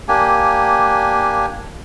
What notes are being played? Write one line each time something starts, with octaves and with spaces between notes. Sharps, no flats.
A#3 D4 G4 G#5